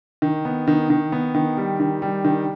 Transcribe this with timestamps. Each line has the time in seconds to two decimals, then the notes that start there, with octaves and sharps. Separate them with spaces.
0.22 D#3
0.45 B3
0.68 D#3
0.90 D#3
1.12 B3
1.35 D#3
1.57 G3
1.80 D#3
2.02 G3
2.24 D#3